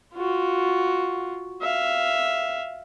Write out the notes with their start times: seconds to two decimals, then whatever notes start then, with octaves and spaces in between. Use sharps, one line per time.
0.15 F4 F#4
1.62 E5 F5